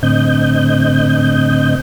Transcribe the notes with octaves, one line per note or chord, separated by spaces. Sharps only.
A2 D3 C4 D#5 G6